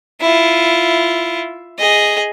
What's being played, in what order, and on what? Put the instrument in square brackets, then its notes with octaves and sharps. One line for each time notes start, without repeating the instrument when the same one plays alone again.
[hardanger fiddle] E4 F4
G#4 D#5